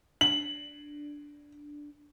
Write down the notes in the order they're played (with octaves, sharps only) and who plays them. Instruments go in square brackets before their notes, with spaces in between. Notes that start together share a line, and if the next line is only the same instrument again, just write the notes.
[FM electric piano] D4 [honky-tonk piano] F#7